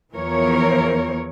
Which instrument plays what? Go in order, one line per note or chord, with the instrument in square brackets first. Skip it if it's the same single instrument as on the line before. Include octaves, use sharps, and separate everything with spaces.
[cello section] E2 E3 F3 A#4 C#5